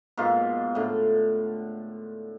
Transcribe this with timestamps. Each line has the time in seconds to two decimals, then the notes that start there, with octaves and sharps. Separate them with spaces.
0.17 G#2 B2 A#3 F4
0.75 A2 D3